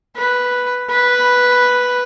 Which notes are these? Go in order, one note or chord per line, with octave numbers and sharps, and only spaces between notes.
B4
B4